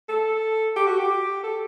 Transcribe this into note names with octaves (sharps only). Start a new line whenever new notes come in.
A4
G4
F#4
G4
A4